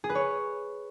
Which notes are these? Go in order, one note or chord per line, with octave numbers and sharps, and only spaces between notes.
G#4
B4
C#5